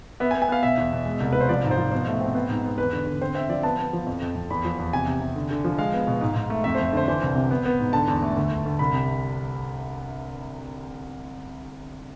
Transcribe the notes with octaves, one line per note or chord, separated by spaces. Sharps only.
B3 E5
G#5
B3
G#5
B3 F5
B2 E5
E2
B2
G#3
C2
C2 B4
C5
F3 D5
G#2
C5
F3
B2 C5
A3
C4
B3
G#2
B3
E2 B4
D3
D3
C4 C5
C4 E5
F3 D5
B3 A5
B3
F3
F2
F2
F2
E2 B5
F3
E2
C3 G#5
C3
C3
D3
D3
F3
G#3 F5
B3
B2
G#2
G#2
A3
F2 E5
F2 C5
D3 C5
E3 C5
C2
C3
B3
B3
G#2
D3 A5
E2
A3
D2
D2
D2
C2 B5
C3